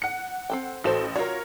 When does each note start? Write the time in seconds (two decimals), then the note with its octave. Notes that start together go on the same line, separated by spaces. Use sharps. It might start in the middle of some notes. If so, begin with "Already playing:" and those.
0.02 F#5 C#7
0.50 C4 A4 G5
0.84 A1 F#4 A4 C5 E7
1.16 F4 F#4 A#4 C#5